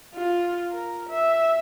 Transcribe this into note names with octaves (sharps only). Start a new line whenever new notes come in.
F4
A#4
E5